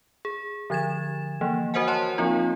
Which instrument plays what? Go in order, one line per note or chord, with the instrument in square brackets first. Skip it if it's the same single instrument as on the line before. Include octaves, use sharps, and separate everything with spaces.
[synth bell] G#4
D3 F3 G#6 A6 E7
E3 F3 A#3
F#4 A#4 C5 D#5 F#5 G#5
C#5 F#5 A5 C6
F3 A#3 C4 D#4 F4